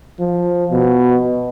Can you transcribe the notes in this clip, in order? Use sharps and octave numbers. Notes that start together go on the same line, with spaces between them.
F3
B2